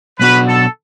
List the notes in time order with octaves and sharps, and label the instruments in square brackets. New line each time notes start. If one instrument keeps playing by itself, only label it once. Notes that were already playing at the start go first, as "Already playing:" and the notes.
[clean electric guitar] B1 B2 B3 D4 F#4 [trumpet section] B4
[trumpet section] A4